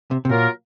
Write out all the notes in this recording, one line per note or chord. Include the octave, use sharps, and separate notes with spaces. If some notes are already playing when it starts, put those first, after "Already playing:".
C3
C3
A#2 F#3 A#3 F4 A#4